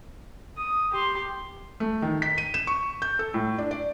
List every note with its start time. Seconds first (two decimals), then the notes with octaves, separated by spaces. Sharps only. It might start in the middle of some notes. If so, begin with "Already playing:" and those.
0.58 D#6
0.92 G4 C6
1.80 A3
2.02 D#3
2.22 B6
2.38 D#7
2.54 E7
2.67 C#6
3.02 G6
3.19 A4
3.34 A2
3.58 D4
3.71 D5